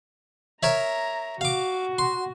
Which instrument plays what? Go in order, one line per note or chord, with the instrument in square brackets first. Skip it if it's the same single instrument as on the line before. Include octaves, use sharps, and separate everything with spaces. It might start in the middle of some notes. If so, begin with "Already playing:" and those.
[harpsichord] A#4 C#5 E5 [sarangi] A#5
[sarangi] F#4 [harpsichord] F5 D6
[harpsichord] C6